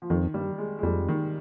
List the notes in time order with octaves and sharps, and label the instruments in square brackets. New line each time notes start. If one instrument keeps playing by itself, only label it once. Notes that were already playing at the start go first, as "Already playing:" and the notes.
[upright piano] F3
[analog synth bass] F2 [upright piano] D#3
[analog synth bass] G2 [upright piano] G3
[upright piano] G#3
G#3
[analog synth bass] F2 [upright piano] G3
[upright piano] D#3